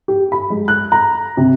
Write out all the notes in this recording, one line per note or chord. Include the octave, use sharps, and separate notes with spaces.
G4
B5
G#3
F#6
A#5
C3